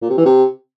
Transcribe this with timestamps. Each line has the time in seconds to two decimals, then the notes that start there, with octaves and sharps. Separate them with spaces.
0.02 A#2
0.10 C3
0.18 E3
0.25 C3